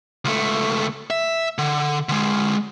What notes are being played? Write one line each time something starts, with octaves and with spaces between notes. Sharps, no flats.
C#2 A3
E5
D3
D3 G#3